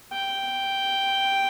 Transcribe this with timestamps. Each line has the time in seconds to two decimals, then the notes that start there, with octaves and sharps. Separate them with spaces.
0.13 G5